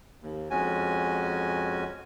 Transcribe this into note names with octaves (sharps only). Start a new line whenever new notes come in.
D#2
F2 G#3 C#4 F#4 G#5